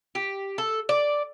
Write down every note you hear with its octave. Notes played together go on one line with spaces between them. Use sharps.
G4
A4
D5